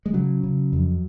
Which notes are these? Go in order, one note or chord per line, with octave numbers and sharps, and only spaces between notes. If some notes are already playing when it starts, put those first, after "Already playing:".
G#3
C#3 F#3
C#3
F2